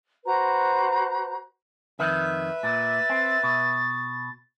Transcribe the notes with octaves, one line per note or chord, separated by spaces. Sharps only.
F#4 B4 C5 A#5
F2 D#3 B4 E5
A#2 A6
C4
B2